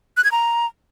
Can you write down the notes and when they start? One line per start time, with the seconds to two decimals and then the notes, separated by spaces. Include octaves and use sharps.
0.17 F#6
0.24 G#6
0.32 A#5